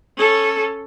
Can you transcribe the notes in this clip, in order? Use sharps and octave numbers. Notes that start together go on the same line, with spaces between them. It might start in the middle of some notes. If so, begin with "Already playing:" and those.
C#4 A4